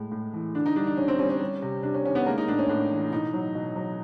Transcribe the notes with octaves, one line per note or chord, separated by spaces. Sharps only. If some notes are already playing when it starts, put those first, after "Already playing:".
Already playing: A2 G#3
A2
E3
D3 D4
D#4
G3 D4
D4
D3 C#4
C4
G3 C#4
C#4
G3
C3
C3 D4
C#4
D#3 C#4
B3
G#3 A#3
D#4
A2 D4
C#4
A2 D4
E3
B2 D#4
F#3
B2
F#3